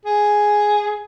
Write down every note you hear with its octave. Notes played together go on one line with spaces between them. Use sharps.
G#4